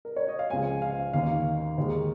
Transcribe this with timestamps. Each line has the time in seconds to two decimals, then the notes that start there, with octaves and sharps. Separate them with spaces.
0.05 A#4
0.16 C#5
0.28 D#5
0.39 F5
0.50 C#2 C#3 F3 G#3 G#5
0.82 F5
1.13 D#2 D#3 A#3 F5
1.78 D#2 D#3 G#3